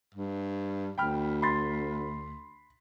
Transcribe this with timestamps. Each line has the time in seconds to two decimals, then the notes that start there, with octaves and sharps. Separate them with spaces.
0.14 G2
0.98 D2 G5 B5 F6
1.42 B5 C6 A6